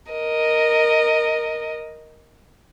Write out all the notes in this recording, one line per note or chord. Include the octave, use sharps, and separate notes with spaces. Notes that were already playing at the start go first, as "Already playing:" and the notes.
A#4 D#5